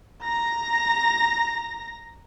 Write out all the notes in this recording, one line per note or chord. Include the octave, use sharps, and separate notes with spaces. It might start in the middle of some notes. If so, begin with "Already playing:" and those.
A#5 A#6